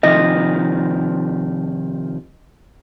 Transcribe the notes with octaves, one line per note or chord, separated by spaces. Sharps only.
C3 D#3 F3 D#5